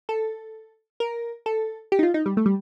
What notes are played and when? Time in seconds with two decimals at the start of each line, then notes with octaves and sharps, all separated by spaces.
0.09 A4
1.00 A#4
1.46 A4
1.92 G4
1.99 D#4
2.03 F4
2.14 D#4
2.26 G3
2.37 A3
2.46 G3